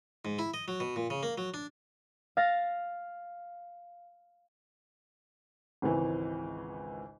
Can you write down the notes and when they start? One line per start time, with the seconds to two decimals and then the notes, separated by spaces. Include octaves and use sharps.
0.25 G#2
0.39 E4
0.54 D#5
0.68 F#3
0.80 B2
0.96 A#2
1.10 C#3
1.23 A#3
1.38 F#3
1.54 D4
2.37 F5 A6 A#6
5.82 G#1 C#2 E3